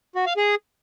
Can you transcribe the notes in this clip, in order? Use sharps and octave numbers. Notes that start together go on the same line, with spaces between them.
F#4
F5
G#4